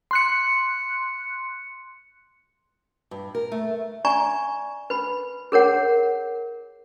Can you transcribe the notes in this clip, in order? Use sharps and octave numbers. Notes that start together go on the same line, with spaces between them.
C6 F#6 C#7
G2
A#4
A3
D5 G#5 A#5 C#6
B4 B5
G#4 A#4 C#5 F#5